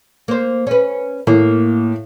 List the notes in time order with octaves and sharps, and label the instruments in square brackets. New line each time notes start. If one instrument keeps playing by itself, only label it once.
[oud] A#3 C5
C#4 B4
[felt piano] A2 [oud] A#3